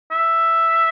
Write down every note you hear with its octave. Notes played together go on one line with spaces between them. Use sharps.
E5